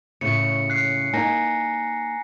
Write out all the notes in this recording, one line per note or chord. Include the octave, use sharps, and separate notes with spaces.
A2 C#3 C#7
F#6 C7
A#3 D#4 G#5 A#5 A#6